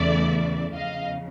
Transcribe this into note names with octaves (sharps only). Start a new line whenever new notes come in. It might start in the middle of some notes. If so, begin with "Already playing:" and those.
Already playing: E2 C#3 E3 A3 D5 E5
E2 C#3 F3 D#5 F5